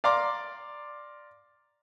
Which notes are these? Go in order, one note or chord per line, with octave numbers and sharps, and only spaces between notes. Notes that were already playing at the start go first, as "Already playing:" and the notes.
D5 F5 A#5 C6 D6